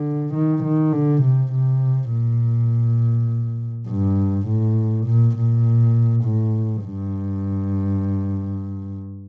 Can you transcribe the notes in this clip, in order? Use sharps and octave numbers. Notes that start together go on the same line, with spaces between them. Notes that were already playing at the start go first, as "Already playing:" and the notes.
Already playing: D3
D#3
D#3
D3
C3
C3
A#2
G2
A2
A#2
A#2
A2
G2